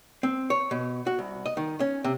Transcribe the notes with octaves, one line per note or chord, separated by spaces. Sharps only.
C4
C#5
B2
F#4
C2
D#5
D#3
C#4
C3